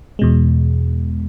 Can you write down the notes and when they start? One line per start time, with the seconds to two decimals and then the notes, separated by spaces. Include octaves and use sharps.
0.19 E2 B2 G#3